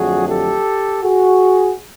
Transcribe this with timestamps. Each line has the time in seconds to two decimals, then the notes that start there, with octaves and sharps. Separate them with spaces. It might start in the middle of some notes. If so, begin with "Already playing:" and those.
Already playing: F2 D3 F#3 A3 F#4 G#4
0.27 G4 A4
1.02 F#4 G#4